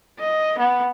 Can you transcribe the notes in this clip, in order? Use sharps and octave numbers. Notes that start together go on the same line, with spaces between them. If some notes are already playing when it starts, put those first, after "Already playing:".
D#5
B3